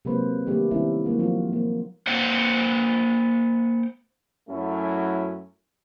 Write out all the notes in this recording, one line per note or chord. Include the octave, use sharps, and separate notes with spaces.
C3 F#3 G#3 A#3 B4 C5
D#3 G3 A3 A#3 D4 G4
D#3 E3 G3 C4 C#4 E4
F#3 G#3 A#3 F#4
F3 F#3 C4 F4
A#3
A#3 C5 F#5 G5
F#2 F#3 A3 C#4 E4